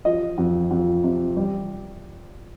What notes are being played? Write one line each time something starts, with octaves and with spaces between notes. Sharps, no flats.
F3 D#5
F2
F2
C3
G3